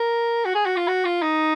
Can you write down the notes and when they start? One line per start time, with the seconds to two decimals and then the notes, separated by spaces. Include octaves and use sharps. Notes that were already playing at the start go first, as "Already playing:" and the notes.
Already playing: A#4
0.45 F#4
0.55 G#4
0.66 F#4
0.77 F4
0.88 F#4
1.05 F4
1.22 D#4